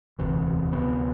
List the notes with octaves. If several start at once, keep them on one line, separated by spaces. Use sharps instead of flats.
E1 D2 C3 E3
D2 C3 F3 B3